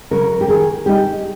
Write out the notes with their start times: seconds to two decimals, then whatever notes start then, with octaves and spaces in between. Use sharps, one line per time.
0.11 C#3 F#3 A#4
0.41 G4
0.48 D#3 G#4
0.86 G3 B3 D#4 G4